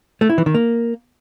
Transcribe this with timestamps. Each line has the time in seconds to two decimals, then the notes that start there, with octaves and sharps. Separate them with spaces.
0.21 A3
0.29 E4
0.38 E3
0.46 D#3
0.55 A#3